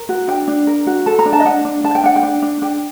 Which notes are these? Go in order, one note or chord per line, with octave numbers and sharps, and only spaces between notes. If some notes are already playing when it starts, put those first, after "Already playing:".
Already playing: A#4
F#4
D4 G5
D4
A#4
F#4
A4 A5
A#5
D4
A5
D#5
D4 F#5
D4
D4 A5
G5
D4 F#5
G5
D4
D4
D4 G5